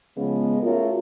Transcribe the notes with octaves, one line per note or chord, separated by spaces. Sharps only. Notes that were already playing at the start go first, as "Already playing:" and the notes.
C#3 F3 G#3 B3
A3 C#4 F4 F#4 G#4 A#4